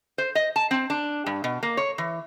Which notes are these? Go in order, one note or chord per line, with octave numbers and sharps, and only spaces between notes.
C5
D#5
A5
C4
D4
G2
B2
A#3
C#5
E3